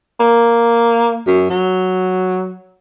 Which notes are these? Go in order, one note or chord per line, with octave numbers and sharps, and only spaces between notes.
A#3
F#2
F#3